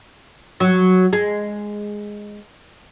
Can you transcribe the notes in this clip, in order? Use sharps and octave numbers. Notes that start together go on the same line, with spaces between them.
F#3
G#3